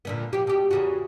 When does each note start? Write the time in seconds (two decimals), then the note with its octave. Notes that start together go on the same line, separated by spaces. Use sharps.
0.05 A#2 D3 B3
0.33 F3 G4
0.47 B2 G4
0.71 E2 C#3 F#4